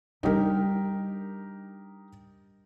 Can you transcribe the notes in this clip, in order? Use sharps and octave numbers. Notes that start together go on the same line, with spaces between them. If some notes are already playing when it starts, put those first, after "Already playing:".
G3 D4 D#4 G4 A#4